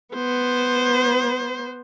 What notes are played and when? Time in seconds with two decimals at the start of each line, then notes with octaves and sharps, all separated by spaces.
0.14 B3 C5